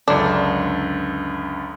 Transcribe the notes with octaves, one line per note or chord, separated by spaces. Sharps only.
C#2 F#2 D3 D4